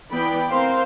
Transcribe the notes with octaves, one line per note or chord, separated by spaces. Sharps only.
E3 B3 D5 G5 B5
C4 A#4 C5 F5 C6